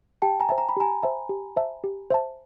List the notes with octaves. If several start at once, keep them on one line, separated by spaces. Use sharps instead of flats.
G4 G5 A5
G#5 A#5
C5 E5 A5
A#5
B5
G4 G#5 A#5
C5 E5 A5
G4
C5 E5 A5
G4
C5 E5 A5